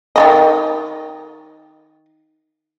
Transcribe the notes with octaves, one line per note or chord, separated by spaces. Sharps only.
D#3 A3 D#5